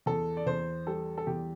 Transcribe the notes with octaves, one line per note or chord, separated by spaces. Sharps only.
E2 A4
D5
E2 C5
G3 A4
A4
E2 G4